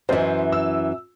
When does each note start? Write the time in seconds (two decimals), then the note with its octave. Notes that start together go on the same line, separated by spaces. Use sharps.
0.09 F#2 E3 C5 D#5 E5
0.52 E6